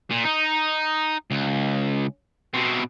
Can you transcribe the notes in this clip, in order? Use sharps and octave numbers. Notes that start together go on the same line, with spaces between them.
A#2
D#4
C#2
B2 C4